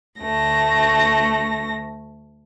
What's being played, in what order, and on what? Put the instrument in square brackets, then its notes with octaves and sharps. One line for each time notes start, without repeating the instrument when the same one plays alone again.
[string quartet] D2 A3 A#6